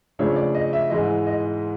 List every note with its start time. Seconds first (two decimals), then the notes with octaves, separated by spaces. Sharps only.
0.19 C#3 F3 A3 D4 C#5
0.36 D5
0.55 D#5
0.73 E5
0.90 G#2 E3 G#3 D#5
1.27 D#5